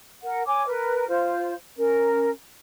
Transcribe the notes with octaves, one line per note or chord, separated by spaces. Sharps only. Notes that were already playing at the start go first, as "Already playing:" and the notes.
A#4 F#5
C#5 G#5 D6
A#4 B4
F4 C5
C#4 A#4